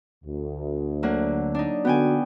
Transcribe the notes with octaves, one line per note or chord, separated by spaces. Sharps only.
D2
D3 F#3 A#3
D4 D#4
D3 B3 F#4 G5 G#5